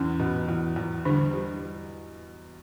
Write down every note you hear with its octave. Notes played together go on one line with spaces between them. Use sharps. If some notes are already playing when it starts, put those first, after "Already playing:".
Already playing: E2 C#4
B2
E2
E2
D3 G3 D4
G3